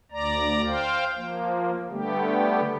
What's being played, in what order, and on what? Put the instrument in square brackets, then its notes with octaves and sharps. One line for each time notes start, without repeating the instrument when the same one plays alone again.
[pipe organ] D2 D5 A#5
C5 F5 G5
F3 A#3
D3 G3 A3 B3 G4